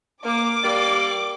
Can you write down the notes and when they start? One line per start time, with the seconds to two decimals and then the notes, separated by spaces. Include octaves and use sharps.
0.24 A#3 D6
0.64 G3 A#3 D5